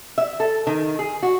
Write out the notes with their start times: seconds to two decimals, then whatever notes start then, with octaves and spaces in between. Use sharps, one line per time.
0.18 E5
0.40 A4
0.67 D#3
0.99 G#4
1.23 F#4